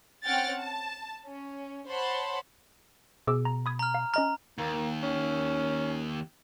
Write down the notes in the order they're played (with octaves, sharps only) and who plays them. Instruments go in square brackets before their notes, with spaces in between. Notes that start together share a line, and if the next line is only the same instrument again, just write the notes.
[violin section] C4 C#4 F#5 G5 F6 A6
A5
C#4
C5 C#5 F#5 A5 B5 C6
[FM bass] B2 [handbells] G#4 D6 E6
[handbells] A#5
B5 D#6 G#6
[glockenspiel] A#5 F6
[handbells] F5
[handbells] C#4 D#5 F6 [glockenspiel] A#5
[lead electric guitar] D#2 [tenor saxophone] A#3
[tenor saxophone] C#4